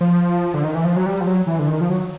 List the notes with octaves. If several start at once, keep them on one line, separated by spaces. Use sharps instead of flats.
F3
D3
D#3
E3
F3
F#3
G3
F3
F#3
E3
D3
D#3
F3
F#3